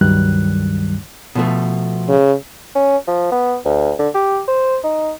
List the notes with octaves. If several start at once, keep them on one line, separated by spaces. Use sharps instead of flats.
C#2 G2 D#3 F#3 G3 F#6
B2 F3 A3
C#3
C#4
F3
B3
D2
D3
G4
C5
D#4